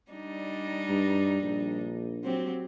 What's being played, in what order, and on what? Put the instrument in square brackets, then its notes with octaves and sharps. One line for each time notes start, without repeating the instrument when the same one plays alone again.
[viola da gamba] G3 D4 D#4
[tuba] G2
A#1
[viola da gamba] F#3 C4 G4